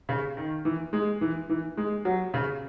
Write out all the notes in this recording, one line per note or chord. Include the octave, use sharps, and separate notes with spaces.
C#3
D#3
E3
G#3
E3
E3
G#3
F#3
C#3